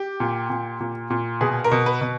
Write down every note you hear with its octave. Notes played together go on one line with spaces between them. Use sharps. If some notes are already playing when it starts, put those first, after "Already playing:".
Already playing: G4
A#2
A#2
A#2
A#2
B2 G#4
A#4
B2
B4
B2